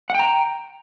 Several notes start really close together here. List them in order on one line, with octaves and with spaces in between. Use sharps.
F#5 G5 A#5